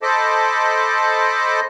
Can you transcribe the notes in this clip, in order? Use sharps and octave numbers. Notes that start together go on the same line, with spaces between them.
A4 C5 D#5 A5 B5 D6